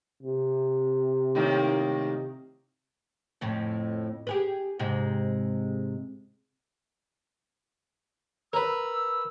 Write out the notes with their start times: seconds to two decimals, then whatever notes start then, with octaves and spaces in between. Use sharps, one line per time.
0.23 C3
1.35 A2 D#3 A#3
3.41 F2 A2 C#3
4.27 G4 G#4 B4
4.79 G#2 C3 G#3
8.53 A#4 B4 E6